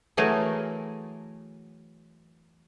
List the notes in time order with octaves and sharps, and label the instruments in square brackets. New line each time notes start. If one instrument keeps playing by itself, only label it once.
[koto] E3 F#3 A3 G#4 A#4